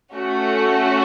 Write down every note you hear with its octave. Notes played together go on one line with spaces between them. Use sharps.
A3 C#4 F#4